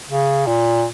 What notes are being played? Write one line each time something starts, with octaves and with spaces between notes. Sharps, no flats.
C#3
A#2